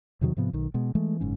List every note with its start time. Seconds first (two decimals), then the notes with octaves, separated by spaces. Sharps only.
0.21 E2 C3 D#3 F#3
0.37 G#2 C3 F3 B3
0.53 B1 D#3
0.74 B2 G#3
0.95 E3 G#3 A3
1.20 F#1 G#2 C#4